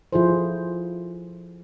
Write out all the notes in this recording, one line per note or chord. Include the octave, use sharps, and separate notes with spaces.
F3 E4 F4 G#4 A4 C5